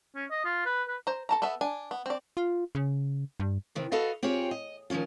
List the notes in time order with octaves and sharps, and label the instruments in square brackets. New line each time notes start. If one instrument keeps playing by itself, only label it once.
[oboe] C#4
D#5
F4
B4
B4
[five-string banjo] C5 A#5
A4 A5 A#5
B3 A4 B4 E5
D4 G#5
B3
C4 D5
[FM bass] F4
C#3
G2
[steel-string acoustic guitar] C3 D#3 E3
F#4 A4 B4 D#5 F5
C4 F4 G4 G#4 C#5
D#5
D#3 F3 G3 C#4 F4